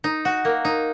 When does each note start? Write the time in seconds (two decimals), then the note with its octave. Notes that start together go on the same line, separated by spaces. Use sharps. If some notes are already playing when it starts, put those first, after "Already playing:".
0.04 D#4
0.25 F#4
0.45 A#3
0.65 D#4